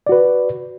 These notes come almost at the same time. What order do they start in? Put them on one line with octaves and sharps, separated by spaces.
D5 F#4 B4